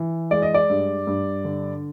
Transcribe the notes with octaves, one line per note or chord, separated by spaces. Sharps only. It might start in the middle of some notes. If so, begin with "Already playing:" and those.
Already playing: E3
G#3 D5
D#5
D5
G2
G2
D3